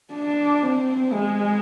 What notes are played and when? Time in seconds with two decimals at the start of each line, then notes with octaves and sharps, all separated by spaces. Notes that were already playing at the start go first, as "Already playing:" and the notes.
0.13 D4
0.63 C4
1.12 G#3